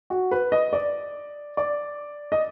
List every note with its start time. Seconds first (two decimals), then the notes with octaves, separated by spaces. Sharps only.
0.10 F#4
0.31 B4
0.52 D#5
0.73 D5
1.57 D5
2.32 D#5